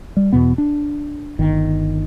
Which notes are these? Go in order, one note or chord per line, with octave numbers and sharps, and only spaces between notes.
G3
E2 B2 B3
D4
G1 D#3